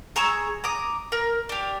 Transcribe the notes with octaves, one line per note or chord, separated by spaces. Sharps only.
G#4 A#5 C#6 E6
A#5 D6 D#6
A#4
D4 G4